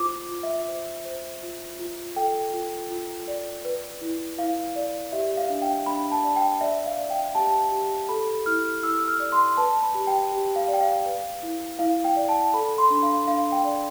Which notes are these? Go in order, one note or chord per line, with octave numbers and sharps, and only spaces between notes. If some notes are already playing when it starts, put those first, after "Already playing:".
Already playing: F4 C5 D6
F4
E5
C5
C5
F4
F4
A4 G5
F4
F4
D5
B4
E4
E4 F5
D5
G4 E5
F5
D4
G5
D4 B5
A5
D5
G5
D5 E5
F5
D5
G5
G4 A5
G4
A4 B5
E4 F6
E4 E6
F6
D5
C6
B4 A5
B5
G4
G5
G4
F5
D5
G5
F5
B4
E4
E4 F5
G5
D5
A5
A4 B5
C6
D4
F5
D4 F5
G5
D5